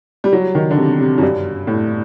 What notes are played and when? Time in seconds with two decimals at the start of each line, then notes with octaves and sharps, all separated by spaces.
0.24 G3
0.33 F#3
0.55 D#3
0.71 D3
0.77 C3
1.00 C3
1.18 F#2
1.22 G2
1.67 A2